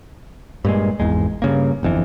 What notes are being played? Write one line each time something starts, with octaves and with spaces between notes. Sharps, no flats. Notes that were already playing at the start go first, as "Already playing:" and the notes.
G2 A#2 G#3
G#1 E2 G#3
G2 C#3 A#3
G1 F2 E3